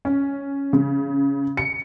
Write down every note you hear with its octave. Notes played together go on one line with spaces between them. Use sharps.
C#4
C#3
C#7